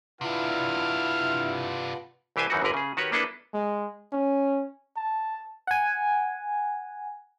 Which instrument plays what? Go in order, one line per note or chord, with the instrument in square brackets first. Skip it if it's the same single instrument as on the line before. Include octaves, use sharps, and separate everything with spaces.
[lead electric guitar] C3 D4 [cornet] E4 [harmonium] F4 B4 F#5 [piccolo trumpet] F6
[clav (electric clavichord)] C2 E3 G4 C5 G#5 A5
F#2 D#3 E3 D#4 F#4
G1 E2 D3 A#4 B4
C#3 G#4
D#3 F#4 G4 B4 C#5
A#3 B3 D4 E4 A4 B4
[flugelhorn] G#3
C#4
A5
[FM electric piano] F#5 G#5